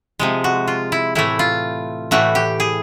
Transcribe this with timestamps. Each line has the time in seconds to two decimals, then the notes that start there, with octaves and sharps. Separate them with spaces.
0.19 C3 F3 G#3
0.44 F#4
0.68 F4
0.92 E4
1.15 A2 E3 A3 E4
1.39 F4
2.11 A2 E3 A3 F#4
2.35 G4
2.60 G#4